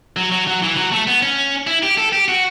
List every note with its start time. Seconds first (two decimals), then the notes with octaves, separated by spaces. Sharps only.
0.17 F#3
0.32 F#3
0.47 F#3
0.62 E3
0.77 F#3
0.92 A3
1.07 B3
1.22 C#4
1.67 E4
1.83 G4
1.98 A4
2.12 G4
2.29 F#4